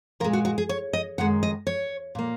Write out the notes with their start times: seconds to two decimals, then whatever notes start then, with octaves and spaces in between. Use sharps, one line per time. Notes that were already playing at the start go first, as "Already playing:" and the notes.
0.20 A#2 A#4
0.24 G#3
0.33 F#4
0.45 F#4
0.58 G#4
0.69 C#5
0.93 D#5
1.18 F#2 D#3 G#3 F#5
1.43 D#5
1.67 C#5
2.15 A#2 A#3